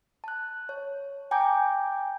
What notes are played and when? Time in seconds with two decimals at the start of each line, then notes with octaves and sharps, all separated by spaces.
0.24 A5 F#6
0.69 C#5
1.31 G5 G#5 A#5 D6 G6